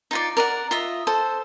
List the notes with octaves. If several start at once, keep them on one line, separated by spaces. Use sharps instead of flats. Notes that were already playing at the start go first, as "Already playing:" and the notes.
D#4 F4 D5
A#4 D5 F#5
F4 D#5 E5
A4 C5